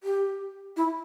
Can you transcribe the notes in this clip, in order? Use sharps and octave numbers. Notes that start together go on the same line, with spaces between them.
G4
E4